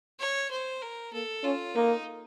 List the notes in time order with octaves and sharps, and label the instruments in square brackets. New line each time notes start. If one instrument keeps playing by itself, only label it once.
[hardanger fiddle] C#5
C5
A#4
[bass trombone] A#3 [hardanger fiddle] A4
[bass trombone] C#4 [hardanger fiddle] F4
[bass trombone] A#3 [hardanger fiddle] D#4